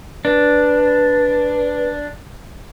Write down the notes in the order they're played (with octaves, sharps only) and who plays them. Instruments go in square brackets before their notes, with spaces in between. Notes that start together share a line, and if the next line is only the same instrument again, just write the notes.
[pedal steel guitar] D4 [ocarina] B4